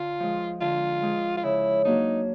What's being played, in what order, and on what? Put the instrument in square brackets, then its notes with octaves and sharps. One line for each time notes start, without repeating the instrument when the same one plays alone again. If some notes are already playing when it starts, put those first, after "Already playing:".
Already playing: [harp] D3 [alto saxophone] F4
[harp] F3 G#3
[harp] D3 [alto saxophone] F4
[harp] F3 G#3
[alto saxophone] F4
[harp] C#3 [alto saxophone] E4
[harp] F#3 A#3 D4 [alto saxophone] D#4